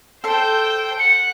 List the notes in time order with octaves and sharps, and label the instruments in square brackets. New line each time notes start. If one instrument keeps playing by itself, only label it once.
[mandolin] A4 C6 [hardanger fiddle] C5 G5
[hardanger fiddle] F#5 [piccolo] C#7